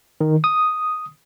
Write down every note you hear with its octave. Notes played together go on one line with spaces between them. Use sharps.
D#3
D#6